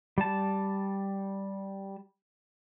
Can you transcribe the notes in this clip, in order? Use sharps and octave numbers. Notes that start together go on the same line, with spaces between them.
G3 A5